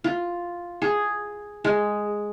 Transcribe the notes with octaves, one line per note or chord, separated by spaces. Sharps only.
F4
G#4
G#3